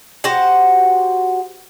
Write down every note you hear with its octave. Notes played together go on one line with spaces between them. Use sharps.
F#4 G4 C5 F#5